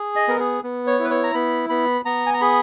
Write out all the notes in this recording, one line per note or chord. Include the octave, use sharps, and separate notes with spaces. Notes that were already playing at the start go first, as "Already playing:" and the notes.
Already playing: G#4
D#5
B3 A#4
G#4
B3
C#5
E4
B4
C#5
A#5
B3 B5
B3 B5
B3 A#5
G#5
A#5
G#4 B5